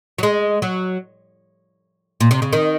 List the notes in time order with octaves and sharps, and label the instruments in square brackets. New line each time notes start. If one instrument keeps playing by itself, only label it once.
[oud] F#3
G#3
F#3
A#2
C3
C#3
D#3